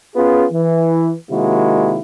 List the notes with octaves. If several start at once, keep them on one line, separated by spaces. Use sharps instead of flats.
B3 C#4 F4 G#4
E3
C3 D#3 G#3 A#3 E4 F#4